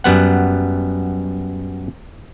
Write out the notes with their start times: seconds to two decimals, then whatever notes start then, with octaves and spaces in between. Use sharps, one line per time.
0.04 F#2 G3 B3 F#5